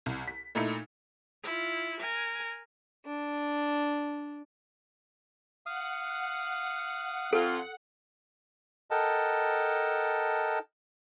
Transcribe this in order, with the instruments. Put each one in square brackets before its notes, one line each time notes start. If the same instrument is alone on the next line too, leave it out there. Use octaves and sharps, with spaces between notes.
[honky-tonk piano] C2
B6
A#2 A3 D#4 E4 C#7
[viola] E4 F4
A#4 G#5
[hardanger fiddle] D4
[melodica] F5 D#6 [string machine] F#5
[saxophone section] F2 F4 [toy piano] A4
[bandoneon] A4 A#4 D#5 F#5 G5 A5